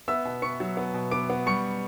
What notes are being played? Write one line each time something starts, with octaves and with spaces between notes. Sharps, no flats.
B3 E5 E6
B2
B3 C#6 C#7
F#3
B3
B2
B3 D6 D7
B3
G3 C#6 C#7